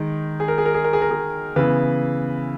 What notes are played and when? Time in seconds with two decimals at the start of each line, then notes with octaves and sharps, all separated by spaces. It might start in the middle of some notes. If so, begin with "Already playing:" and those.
Already playing: D#3 G#3 D#4
0.40 G#4
0.48 A#4
0.58 G#4
0.66 A#4
0.74 G#4
0.84 A#4
0.93 G#4
1.02 A#4
1.11 G#4
1.56 C#3 E3 B3 B4